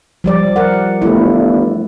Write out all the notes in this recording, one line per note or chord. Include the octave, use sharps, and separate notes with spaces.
F3 G3 D5
A#4 F#5
G1 A3 E4